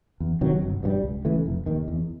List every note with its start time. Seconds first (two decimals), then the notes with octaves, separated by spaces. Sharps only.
0.20 E2
0.41 C3 D#3 F#3
0.62 G1
0.83 G2 E3 G3
1.03 C#2
1.25 C#3 E3 A3
1.46 F1
1.66 D#2 D#3
1.88 E2